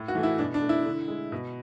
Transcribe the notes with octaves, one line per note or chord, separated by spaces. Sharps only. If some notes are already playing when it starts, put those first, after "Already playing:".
Already playing: A2
F#4
E3 A3
E4
B2 D4
D4
A3
E4
D3
G#3
B2